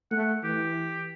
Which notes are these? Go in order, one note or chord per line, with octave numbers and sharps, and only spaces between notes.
A3 F#5
E3 G4